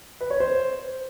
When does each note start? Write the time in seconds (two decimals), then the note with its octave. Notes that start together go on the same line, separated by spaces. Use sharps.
0.21 B4
0.30 C#5
0.40 C5